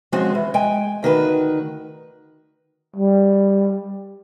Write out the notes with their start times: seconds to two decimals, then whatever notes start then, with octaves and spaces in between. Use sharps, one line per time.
0.12 F3 G#3 C4 C#4 F#4
0.35 E3
0.54 G#3 G5 G#5
1.03 D2 D#3 F#4 B4
2.96 G3